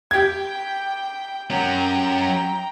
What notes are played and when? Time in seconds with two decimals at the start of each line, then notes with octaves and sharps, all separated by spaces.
0.11 G4 G5 G#6
1.50 F#3 C#4 G5 A#5